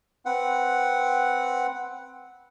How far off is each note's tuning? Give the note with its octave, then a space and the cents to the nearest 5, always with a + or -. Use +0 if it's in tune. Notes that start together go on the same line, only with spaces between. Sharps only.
C4 +0 B4 +0 F#5 +0